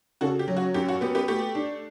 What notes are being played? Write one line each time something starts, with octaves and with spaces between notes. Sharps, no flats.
C#3 F#4 A4
G4
F#3
F#4
F#2 G4
F#4
B3 G4
G4 B4
A3 G4
D4